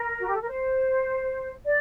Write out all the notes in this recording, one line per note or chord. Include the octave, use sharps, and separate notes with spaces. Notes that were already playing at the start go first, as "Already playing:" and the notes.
Already playing: A#4
F#4
G4
A4
A#4
C5
D5